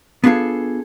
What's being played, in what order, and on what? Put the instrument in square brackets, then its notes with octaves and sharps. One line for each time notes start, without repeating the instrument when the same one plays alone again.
[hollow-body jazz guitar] B3 D4 F4 G#4 A4